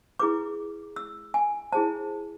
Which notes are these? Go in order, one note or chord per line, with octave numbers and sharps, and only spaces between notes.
E4 G#4 B4 D6
E6
G#5
E4 G#4 C5 A5